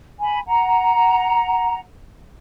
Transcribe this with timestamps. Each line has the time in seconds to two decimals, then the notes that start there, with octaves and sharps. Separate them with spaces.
0.20 G#5 B5
0.47 F#5 A#5